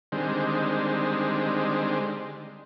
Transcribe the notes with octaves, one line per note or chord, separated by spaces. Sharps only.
D3 D#3 G3 G#3 C4